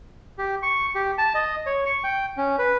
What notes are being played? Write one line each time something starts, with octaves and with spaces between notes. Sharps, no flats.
G4
C#6
G4
A5
D#5
C#5
C#6
G5
C#4
B4